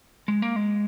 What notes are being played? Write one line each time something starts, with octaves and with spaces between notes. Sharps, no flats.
G#3
A#3
G#3